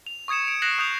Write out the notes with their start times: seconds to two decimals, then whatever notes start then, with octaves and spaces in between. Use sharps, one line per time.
0.07 F7
0.28 C#6 D#6 G#6 C#7 E7
0.48 D7
0.62 F#6 A#6 C7 D7 E7 F#7
0.79 D#6 G6 F7